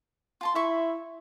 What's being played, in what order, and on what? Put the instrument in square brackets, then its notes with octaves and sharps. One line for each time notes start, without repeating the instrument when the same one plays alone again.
[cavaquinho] F4 A5 C6
[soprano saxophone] E4 [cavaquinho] E5 C#6